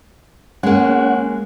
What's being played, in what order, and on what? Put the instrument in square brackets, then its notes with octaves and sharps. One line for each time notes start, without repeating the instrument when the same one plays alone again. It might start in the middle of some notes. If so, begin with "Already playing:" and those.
[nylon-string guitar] G#3 A#3 [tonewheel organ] C#4 F#5